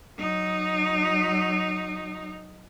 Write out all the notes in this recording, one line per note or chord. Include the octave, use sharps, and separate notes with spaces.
F#3 D#4